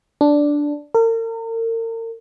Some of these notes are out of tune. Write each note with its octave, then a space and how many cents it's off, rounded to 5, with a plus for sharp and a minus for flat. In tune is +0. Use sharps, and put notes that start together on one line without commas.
D4 -5
A#4 -40